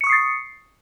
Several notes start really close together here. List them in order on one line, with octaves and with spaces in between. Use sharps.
C#7 C#6 D#6 C7 A6